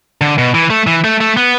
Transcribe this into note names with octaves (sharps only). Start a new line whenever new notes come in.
D3
B2
E3
A3
E3
A3
A3
B3